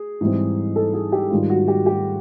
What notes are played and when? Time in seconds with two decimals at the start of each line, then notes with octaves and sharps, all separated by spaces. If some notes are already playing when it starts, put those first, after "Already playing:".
Already playing: G#4
0.21 G#2 E3 G3 C4
0.76 A4
0.94 G#4
1.12 G4
1.31 G#2 D#3 G3 F4
1.50 F#4
1.68 G4
1.86 G4